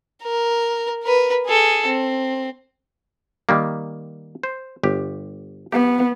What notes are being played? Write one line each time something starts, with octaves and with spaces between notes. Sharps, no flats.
A#4
A#4 B4
G#4 A4
C4
D#3 G3 A#3
C5
G1 G4
B3 G4